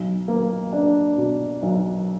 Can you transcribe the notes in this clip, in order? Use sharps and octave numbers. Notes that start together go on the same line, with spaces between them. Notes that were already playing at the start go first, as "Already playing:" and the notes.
Already playing: B1
A#3
D4
B2
B1